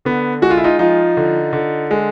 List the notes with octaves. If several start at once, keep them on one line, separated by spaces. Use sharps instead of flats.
D3 B3
G#3 F#4
F4
E4
D#4 F4
F3 D#4 F4
D3
D3
G#3